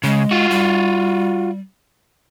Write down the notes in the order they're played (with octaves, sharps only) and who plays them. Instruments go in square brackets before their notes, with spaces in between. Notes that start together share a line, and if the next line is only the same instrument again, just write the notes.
[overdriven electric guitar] C#3 [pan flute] G#3
[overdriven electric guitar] F4 F#4
[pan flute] G3